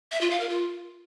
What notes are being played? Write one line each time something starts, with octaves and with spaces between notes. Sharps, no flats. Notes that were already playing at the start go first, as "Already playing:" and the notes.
E5
F4
F5
A#4
F4